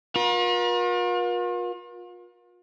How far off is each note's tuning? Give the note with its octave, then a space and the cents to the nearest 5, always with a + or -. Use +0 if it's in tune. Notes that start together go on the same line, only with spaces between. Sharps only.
F4 +40 A#4 +45